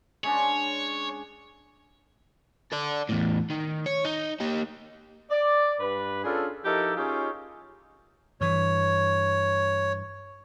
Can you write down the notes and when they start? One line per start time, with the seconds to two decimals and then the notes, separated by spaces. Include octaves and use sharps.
0.24 G#3 C#4 D4 C#5
2.72 A4 D5
3.09 E2 A2
3.50 D#3
3.86 C#5
4.05 D#4
4.40 A#3 G4
5.31 D5
5.80 G2 B4
6.24 C#4 D4 F4 G#4 A4
6.65 F3 D#4 E4 G4 A4 A#4
6.96 C#4 D#4 F4 G4 G#4 C#5
8.41 G2 E3 C#5